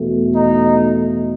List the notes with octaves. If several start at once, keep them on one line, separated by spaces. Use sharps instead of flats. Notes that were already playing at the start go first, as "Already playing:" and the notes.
Already playing: E2 B2 A3
D#4